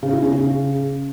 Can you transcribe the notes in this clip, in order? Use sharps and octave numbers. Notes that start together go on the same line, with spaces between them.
C#3
E4
C#4
C#3